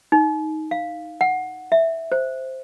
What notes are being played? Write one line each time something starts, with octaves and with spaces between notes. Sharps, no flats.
D#4
F5
F#5
E5
C5